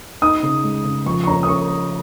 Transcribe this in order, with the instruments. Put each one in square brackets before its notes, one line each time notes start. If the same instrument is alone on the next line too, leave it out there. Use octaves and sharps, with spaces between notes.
[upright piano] D#4 D#6
C#3
G#3
C#3
F3 C#6
C#6
C#4 A#5
D#6
C#4 C#6